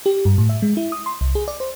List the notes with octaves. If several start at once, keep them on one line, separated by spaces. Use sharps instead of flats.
G4
G2
A2
E5
G#3
E4
D#6
C6
C2
G#4
D5
C5